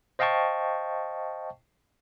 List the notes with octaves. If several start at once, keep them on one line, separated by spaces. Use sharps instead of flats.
C5 D#5 F5 G5 A5 C#6